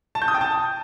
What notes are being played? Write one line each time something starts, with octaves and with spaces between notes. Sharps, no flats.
A5
G6
D#6
G5
A5